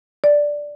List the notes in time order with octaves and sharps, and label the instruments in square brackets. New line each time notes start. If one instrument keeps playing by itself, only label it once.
[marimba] D5